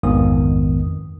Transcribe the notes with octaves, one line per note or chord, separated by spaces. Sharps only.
A#1 F2 G#2 D#3 B3 D#6